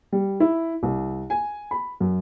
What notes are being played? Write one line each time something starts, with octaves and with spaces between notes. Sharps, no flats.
G3
E4
C2
G#5
B5
F#2